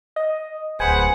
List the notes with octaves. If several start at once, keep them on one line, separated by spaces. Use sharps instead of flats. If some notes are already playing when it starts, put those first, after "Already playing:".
D#5
D1 G#4 B4 C5 F#5 G#5